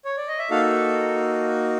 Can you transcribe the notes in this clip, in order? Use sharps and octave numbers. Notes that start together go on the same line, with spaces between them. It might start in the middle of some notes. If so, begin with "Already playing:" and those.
C#5
D5
D#5
E5
A#3 D#4 F#4 A4 F5